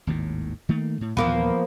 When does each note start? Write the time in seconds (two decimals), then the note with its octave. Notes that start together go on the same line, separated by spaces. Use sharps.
0.07 G#1 D#2 A2
0.69 D#3 A3 A#3
1.01 A2
1.17 D#2 A#2 E3 F3 A#3 B3